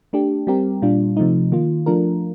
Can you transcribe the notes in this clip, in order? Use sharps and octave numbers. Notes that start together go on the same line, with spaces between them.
A3 D4 G4
G3 C4 G4 A#4
A#2 G3 D4 F4
C3 F3 A3 D#4
D#3 A#3 F4
F3 A3 D4 F4 A#4